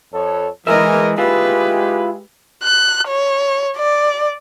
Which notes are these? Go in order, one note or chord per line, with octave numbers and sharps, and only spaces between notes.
F2 A4 C#5
E3 G#3 G#4 A#4 D#5 E5
G#3 E4 F4 G4 G#4 B4
F#6
C#5
D5